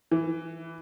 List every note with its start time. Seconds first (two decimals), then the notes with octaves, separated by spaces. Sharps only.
0.11 E3